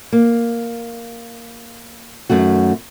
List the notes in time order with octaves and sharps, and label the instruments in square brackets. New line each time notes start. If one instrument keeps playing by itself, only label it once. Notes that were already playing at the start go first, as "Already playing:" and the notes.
[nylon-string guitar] A#3
F#2 D#3 A3 F#4